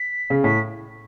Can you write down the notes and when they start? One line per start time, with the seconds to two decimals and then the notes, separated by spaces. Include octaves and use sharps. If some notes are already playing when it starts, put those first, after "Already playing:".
Already playing: B6
0.30 C#3
0.44 A2 B6